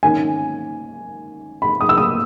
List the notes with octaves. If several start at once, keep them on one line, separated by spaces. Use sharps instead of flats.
G#2 D#3 A#3 C#4 G#5
B5
D#6
E6
D#6